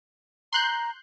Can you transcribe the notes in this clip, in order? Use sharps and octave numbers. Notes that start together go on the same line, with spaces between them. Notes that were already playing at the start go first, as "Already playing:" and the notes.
A#5 C6 F#6 G6